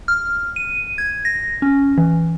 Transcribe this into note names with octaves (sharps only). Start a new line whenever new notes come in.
F6
D#7
G#6
A#6
C#4
E3